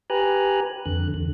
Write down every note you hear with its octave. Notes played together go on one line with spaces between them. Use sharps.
G4 B4 G#5 A#5 F#6
F2 D3 F#6
E2 D3